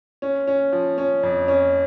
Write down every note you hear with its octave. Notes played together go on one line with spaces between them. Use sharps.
C#4
C#4
F3
C#4
F2
C#4